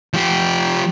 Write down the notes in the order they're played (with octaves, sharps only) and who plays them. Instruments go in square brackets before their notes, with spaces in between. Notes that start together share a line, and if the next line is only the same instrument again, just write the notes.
[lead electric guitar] F3 G4